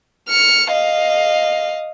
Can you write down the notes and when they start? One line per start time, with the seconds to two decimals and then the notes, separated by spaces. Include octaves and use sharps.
0.29 F6 C#7
0.73 D#5 F5